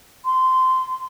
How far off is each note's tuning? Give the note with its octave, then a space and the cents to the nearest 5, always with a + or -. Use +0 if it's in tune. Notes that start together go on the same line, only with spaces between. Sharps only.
C6 -15